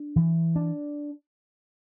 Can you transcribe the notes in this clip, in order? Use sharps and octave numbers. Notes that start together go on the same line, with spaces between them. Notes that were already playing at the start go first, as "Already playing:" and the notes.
Already playing: D4
E3
D4